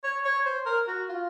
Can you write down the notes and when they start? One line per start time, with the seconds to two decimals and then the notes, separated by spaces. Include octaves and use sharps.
0.04 C#5
0.25 C#5
0.46 C5
0.66 A#4
0.87 F#4
1.09 F4